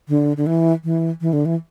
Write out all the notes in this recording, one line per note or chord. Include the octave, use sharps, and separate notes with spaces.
D3
D3
E3
E3
E3
D3
E3